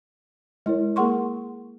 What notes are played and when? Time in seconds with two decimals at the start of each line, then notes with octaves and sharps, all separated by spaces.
0.66 G#3 E4 A#4 C#5
0.96 A#3 G#4 A#4 F#5 C6 C#6